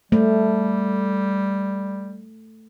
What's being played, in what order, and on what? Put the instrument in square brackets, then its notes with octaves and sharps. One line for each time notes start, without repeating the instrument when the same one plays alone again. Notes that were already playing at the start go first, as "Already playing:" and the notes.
[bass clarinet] G3 [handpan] A3